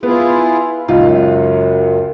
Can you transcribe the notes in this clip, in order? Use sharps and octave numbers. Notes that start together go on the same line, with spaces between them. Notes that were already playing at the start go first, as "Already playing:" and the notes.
B3 E4 F4 G#4
C#2 F#2 D#4 F4